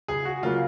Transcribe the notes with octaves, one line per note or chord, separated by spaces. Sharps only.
C#2 G#4
F#4
C#3 F#3 A#3 F4